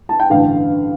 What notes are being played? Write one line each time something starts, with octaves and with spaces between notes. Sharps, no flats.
A5
G5
A1 G2 D3 F5